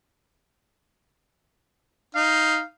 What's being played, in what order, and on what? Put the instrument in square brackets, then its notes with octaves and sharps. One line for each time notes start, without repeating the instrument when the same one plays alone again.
[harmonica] D#4 [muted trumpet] F5